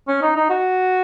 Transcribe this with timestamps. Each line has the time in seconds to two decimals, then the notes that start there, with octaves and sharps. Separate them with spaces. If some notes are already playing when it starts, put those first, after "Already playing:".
0.08 C#4
0.22 D#4
0.36 D#4
0.50 F#4